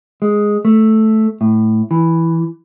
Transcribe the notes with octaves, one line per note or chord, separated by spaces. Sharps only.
G#3
A3
A2
E3